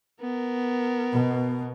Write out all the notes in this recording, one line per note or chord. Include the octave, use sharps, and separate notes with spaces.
B3 A#4
B2